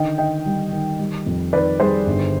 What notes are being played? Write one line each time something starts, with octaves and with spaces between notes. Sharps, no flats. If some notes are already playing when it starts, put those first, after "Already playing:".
Already playing: D3 D#3 D#5 G5
D#3 D#5 G5
G3
D#3
G3
F2
D#3 B4 D5
G3 G#4 C5
G1